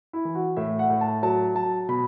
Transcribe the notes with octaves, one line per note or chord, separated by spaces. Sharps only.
E4
E3
F#4
A2 E5
F#5
A2
A5
F#3 A5
F#3 A5
B2 B5